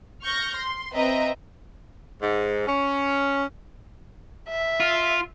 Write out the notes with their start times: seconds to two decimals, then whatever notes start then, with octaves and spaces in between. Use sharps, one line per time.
0.23 C#6 F6 G6 A#6
0.56 C6
0.94 C4 B4 D#5 E5 A#5
2.22 G#2
2.68 C#4
4.49 E5
4.80 F4